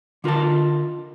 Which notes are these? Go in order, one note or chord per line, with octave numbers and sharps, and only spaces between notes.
D3 F4 A#4 D#5 A5